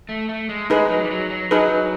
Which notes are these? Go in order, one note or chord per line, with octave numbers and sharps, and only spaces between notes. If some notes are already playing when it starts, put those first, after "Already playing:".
A3
A3
G#3
G#3 D#4 G#4 B4
F#3
G3
F#3
F#3
F#3 D#4 G#4 B4